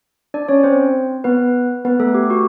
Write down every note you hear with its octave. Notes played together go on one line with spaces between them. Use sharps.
D4 D5
C#4 C#5
C4 C5
B3 B4
B3 B4
A3 A4
G4
F#4